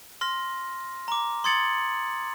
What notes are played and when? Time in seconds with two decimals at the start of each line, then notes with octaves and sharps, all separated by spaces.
0.21 C6 F6 A#6
1.08 A#5 D6
1.44 C6 D#6 G#6 A6 C#7 F#7